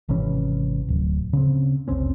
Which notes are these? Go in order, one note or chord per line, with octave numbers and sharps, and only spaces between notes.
G#1 C3 E3 C#4
D1
C#3 C4
F1 C2 C4 C#4